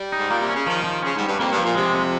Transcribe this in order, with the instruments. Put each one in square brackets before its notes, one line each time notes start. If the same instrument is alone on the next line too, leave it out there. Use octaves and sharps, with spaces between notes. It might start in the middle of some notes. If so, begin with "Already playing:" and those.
Already playing: [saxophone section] G3
[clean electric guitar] D#4
[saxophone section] G#2
[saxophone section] A#2 [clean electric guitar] A#3
[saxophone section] C3
[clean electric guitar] C#4
[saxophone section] C#3
[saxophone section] D#3 [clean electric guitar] F3
[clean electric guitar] F3
[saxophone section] C#3 [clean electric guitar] C#4
[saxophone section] G#2
[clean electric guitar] G3
[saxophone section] G2
[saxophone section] F2 [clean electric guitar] A#3
[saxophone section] G2
[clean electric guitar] F3
[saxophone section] A#2
[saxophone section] C3 [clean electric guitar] G#3
[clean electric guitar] F2